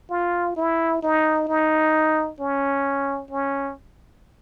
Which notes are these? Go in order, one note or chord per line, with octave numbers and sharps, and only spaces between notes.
F4
E4
D#4
D#4
C#4
C#4